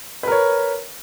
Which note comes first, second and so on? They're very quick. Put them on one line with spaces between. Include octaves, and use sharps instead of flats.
B4 A#4 C#5